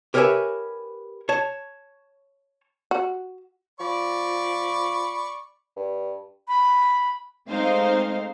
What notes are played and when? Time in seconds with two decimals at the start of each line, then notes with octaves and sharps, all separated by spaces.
0.14 G4 A#4 B4 C#5 E5 G#5
1.29 C#5 A5
2.91 F#4
3.80 F3 D5 B5 C#6
5.76 G2
6.48 B5
7.50 G#3 A3 C4 D#4 C5 F5